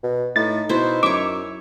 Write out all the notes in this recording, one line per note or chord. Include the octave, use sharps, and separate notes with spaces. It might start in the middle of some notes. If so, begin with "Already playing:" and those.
B2
A2 D#4 A6
B2 E4 C5
F#2 C#5 E5 D6